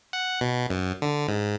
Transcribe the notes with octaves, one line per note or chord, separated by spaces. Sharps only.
F#5
B2
F#2
D3
G#2